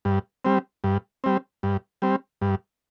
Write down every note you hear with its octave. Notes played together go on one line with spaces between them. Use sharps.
G2
G3 C4
G2
G3 C4
G2
G3 C4
G2